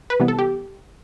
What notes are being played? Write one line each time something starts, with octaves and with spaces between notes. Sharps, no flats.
B4
C3 E3 G3 B3
A4
G4